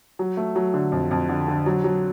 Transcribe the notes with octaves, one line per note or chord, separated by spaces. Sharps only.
F#3
A3
F#3
D3
F2
F2
D3
D3
F#3
F#3